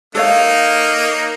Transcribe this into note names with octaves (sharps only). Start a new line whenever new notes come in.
A#3 D#4 A4 C#5 F5